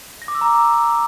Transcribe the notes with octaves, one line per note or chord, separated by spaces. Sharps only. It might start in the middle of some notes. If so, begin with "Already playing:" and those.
A#6
D6
E6
A#5